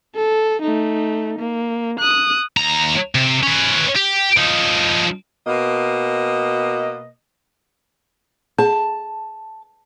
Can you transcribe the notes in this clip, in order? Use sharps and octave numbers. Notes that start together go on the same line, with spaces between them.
A4
A3 D#4
A#3
D#6 F#6
D#2 A#5
C3
C#4 B4
G4
F3 D#4
B2 A#3 D#5
G#4 A5